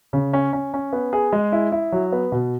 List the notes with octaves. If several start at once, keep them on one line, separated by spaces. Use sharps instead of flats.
C#3
C#4
C#4
C#4
B3
G#4
G#3
E4
E4
F#3
B3
B2